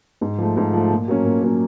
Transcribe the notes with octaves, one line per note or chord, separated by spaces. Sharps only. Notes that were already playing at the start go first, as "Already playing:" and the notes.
G#2
F3 A3
G#2
F3 A3
A#2
F#3 A#3 C#4
A#2
F#3 A#3 C#4